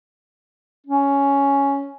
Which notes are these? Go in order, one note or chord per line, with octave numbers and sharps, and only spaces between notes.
C#4